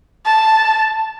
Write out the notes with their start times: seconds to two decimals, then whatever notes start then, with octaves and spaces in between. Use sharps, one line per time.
0.26 A5